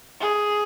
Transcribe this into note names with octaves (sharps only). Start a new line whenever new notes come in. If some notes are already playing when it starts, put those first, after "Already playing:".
G#4